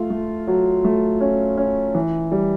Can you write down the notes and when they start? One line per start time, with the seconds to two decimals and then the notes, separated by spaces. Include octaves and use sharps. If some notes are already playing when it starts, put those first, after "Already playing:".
Already playing: A3 F4
0.10 A3
0.47 F#3
0.84 A3
1.21 C#4
1.57 C#4
1.95 E3
2.32 G3